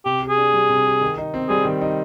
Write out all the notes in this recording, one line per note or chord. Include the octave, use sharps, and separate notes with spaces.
C3 G4
G4
G#4
D4
G3
C3
G4
D#3
D#4
C4
G3 G#4
D#3
D#4